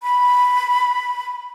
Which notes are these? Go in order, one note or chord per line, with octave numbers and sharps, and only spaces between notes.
B5